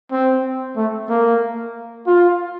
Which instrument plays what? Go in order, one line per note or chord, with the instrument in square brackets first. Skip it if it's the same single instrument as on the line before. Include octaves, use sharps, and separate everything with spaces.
[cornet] C4
A3
A#3
F4